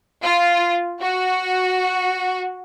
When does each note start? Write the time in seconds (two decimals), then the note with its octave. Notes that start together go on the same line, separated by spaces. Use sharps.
0.23 F4
1.00 F#4